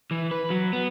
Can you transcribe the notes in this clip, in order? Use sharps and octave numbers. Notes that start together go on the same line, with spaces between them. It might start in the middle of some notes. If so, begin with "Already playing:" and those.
E3
B4
F#3
B3